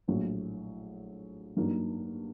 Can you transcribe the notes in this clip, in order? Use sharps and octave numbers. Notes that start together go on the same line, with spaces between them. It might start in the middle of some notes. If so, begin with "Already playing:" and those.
A#1 A2 F#3
G2 F#3 A#3 D#4